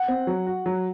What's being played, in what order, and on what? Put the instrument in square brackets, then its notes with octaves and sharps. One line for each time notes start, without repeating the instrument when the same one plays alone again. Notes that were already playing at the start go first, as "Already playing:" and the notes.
Already playing: [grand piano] F#5
[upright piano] C4
F#3
F#4
F#3